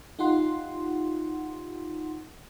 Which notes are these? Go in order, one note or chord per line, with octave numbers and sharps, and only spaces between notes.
D#4 F4 G4 F#5 C6